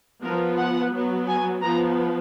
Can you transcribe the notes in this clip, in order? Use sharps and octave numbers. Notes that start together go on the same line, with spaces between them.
F3 B3 A#4
F#5
F#3 B3
G#5
F3 B3 A#5